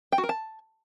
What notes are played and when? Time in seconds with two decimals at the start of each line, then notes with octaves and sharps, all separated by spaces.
0.12 G5
0.18 F#4
0.24 A#4
0.29 A5